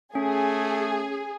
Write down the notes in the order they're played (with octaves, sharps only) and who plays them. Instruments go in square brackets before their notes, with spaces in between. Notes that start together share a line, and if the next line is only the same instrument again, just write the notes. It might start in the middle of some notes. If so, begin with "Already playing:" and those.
[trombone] A3 [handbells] C#4 [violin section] G#4